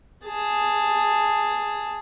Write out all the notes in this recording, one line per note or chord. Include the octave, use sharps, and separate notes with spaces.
G#4 A5